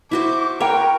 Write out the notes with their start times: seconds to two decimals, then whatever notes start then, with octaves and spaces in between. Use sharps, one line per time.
0.11 E4 F#4 C5 D6
0.60 A#4 B4 C#5 G5